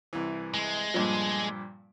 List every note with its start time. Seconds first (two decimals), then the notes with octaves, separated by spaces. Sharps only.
0.13 C2 E3
0.54 G#3
0.94 G2 A#2 F3